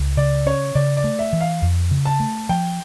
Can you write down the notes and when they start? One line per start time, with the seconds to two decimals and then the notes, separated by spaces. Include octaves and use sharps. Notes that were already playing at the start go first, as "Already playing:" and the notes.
Already playing: C#2
0.17 C#3 D5
0.46 C#4 C#5
0.75 C#3 D5
0.97 D5
1.04 A3
1.19 E5
1.33 E3
1.41 F5
1.62 F2
1.91 C#3
2.05 A5
2.20 A3
2.49 F3 G5